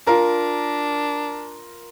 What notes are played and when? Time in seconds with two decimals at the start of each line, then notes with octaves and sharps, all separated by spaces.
0.07 D4 F4 A#4